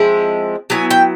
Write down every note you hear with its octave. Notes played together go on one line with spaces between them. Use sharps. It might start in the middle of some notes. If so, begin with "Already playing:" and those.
Already playing: F3 G#3 C4 E4
F#3 B3 E4 G#5
G5